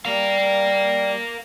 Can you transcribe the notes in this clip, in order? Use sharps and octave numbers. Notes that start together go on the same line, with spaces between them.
G3 A#4 F5